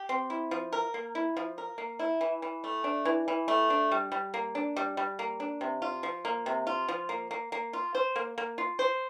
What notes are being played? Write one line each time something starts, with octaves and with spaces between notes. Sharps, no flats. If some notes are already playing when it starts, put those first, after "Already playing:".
Already playing: G4
C4
E4
F3
A#4
A#3
E4
F3
A#4
A#3
E4
E3
E3
A3
D4
E3
E3
A3
D4
G3
G3
A#3
D4
G3
G3
A#3
D4
C3
F4
F3
A#3
C3
F4
F3
A#3
A#3
A#3
F4
C5
A#3
A#3
F4
C5